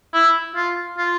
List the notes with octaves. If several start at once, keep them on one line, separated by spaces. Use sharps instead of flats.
E4
F4
F4